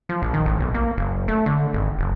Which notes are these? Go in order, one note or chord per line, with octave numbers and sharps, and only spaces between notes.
F3
A#1
D#3
A1
B1
A#3
F#1
A3
D3
G#1
F#1